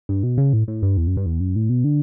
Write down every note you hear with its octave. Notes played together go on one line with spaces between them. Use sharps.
G2
B2
C#3
A2
A2
G2
E2
F#2
G2
E2
F#2
A2
B2
D3